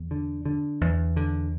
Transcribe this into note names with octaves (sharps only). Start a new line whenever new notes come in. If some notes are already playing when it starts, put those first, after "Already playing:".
Already playing: E2
D3
D3
E2
D3